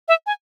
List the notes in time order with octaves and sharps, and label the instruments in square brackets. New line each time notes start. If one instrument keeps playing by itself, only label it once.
[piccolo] E5
G#5